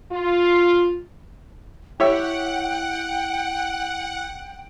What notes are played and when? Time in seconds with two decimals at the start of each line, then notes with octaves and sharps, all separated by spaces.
0.12 F4
2.00 E4 G4 C#5 E5 F#5 G5